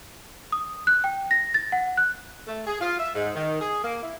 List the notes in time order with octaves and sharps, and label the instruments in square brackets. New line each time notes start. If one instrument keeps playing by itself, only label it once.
[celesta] D#6
F#6
G5
A#6
A6
F#5
F#6
[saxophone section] A3
G#4
F4
E5
G#2
D#3
G#4
A#3
E4